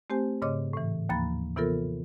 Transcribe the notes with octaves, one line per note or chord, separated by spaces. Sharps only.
A3 C4 G4 C5 G#5
G#2 C#3 C#5 D#5 D6
A2 E3
D#2 F3 A#3 B5 A6
C3 E3 B3 F4 A4 A#4